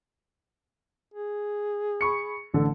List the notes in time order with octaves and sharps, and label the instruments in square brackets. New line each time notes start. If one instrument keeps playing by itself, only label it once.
[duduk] G#4
[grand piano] B5 C#6 C#7
A1 D3 A4